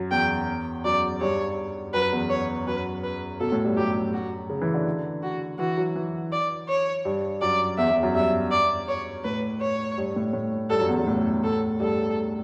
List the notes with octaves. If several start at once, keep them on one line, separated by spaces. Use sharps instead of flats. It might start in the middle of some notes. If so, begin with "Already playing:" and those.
Already playing: F#2
E2 G5
F#2 D5
G2 C#5
F#2 B4
E2
C#5
F#2 B4
B4
B2 A4
A2
G2
F#2 G4
F#4
C#3
E3
D3
F#4
E3 F#4
F#3
E3
D5
C#5
G2
F#2 D5
E2 E5
E2
F#2
G2 E5
D5
C#5
A2 B4
C#5
G2
A2
A2
G2 A4
F#2
E2
F#2
A2
A4
G2 A4